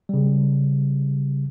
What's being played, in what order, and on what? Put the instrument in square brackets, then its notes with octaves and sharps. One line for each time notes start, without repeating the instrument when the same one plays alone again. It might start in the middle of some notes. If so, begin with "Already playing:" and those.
[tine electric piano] C#3 G3